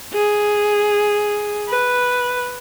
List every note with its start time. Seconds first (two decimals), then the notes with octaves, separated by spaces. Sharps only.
0.13 G#4
1.69 B4